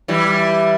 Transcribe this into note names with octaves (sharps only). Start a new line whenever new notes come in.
E3 G3